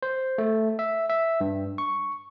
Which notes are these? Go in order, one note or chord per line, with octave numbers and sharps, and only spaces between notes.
C5
A3
E5
E5
G2
C#6